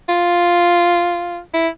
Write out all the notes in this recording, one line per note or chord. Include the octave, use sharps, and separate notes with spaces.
F4
E4